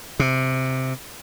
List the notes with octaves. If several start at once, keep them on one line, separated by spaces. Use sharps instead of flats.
C3